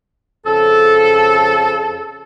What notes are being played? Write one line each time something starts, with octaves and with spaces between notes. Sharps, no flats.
F2 C#3 A4